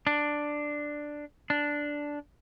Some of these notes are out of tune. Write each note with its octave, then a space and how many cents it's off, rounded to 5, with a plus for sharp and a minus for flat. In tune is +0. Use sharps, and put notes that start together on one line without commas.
D4 +5
D4 -5